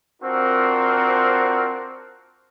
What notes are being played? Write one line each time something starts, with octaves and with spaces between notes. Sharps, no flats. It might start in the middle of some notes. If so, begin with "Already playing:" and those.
C4 D4 F4 F#4 A#4 C5